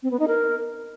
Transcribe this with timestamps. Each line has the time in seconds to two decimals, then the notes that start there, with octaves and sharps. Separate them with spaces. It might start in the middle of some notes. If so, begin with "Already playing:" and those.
0.03 C4
0.11 B3
0.19 D#4
0.28 A#4